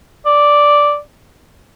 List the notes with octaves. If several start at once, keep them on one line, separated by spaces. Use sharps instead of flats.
D5